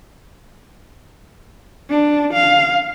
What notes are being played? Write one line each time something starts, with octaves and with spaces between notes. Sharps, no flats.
D4
F5